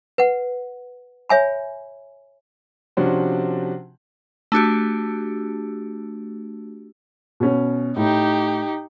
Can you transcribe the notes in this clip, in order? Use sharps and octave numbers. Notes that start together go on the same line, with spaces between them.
B4 F#5
C#5 E5 G#5 B5
C3 F3 C#4 D4 F#4 C5
A3 D4 F#4 G4
B2 C#4
A2 D#4 G4